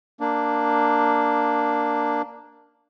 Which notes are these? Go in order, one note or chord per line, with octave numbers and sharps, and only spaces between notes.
A#3 D4